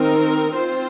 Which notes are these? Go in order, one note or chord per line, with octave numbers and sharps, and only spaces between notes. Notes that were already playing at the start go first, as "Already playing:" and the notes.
Already playing: D#3 C4 D#4 A#4
C4 F4 C5